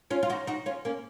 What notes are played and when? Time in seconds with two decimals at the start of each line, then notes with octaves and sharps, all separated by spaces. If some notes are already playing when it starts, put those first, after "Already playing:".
0.11 C#4 F4
0.23 F4
0.30 D#4 F#4
0.47 D#4 F#4
0.66 C#4 F4
0.85 A#3 C#4